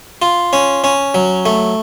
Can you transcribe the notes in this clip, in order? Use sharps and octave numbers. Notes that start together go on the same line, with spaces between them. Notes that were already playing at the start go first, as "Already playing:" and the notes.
F4
C#4
C#4
F#3
A3